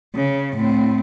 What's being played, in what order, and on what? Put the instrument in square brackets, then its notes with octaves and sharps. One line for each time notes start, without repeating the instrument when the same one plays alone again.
[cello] C#3
A2 C4